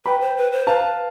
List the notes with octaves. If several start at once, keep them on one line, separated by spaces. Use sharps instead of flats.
B4 G5 B5
C5
B4
C5
B4 F5 A5